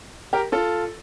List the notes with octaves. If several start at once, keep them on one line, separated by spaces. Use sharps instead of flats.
G4 A#4
F4 A4